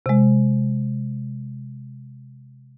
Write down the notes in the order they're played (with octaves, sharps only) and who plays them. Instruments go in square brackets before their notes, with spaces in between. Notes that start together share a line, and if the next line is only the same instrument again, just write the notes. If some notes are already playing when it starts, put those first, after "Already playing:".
[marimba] C3 G#3